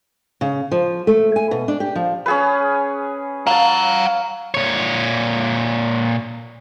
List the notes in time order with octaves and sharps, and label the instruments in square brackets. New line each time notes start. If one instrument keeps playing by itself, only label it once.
[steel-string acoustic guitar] C#3
F3
A3
G#5
B2
D4
G4
F3
[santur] C#4 G#4 B4
[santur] F5 A5 [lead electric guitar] F#5 A#5
[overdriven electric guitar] A#2 C#5